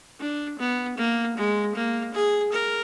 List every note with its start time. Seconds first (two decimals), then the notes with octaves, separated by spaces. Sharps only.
0.20 D4
0.59 B3
0.97 A#3
1.37 G#3
1.75 A#3
2.14 G#4
2.53 A#4